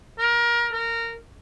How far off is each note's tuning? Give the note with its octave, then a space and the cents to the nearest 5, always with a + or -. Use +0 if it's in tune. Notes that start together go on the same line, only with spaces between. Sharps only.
A#4 +25
A#4 -15